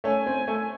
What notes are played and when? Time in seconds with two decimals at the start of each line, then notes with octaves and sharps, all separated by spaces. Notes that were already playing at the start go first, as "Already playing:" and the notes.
0.04 A3 C#4 G#5
0.26 C4
0.48 A3